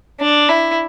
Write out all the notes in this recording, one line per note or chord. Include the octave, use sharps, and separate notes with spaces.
D4
E4